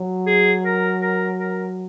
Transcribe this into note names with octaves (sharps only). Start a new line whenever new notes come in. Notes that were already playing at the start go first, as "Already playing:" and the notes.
Already playing: F#3
G#4
A#4
A#4
A#4